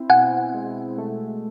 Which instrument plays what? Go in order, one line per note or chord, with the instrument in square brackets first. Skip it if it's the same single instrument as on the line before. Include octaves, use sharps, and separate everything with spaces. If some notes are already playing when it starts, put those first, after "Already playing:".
Already playing: [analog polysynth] C4 E4
[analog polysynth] B2 [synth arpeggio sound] F#5 G#5
[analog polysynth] G#3
A3